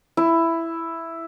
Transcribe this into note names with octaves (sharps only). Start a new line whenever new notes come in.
E4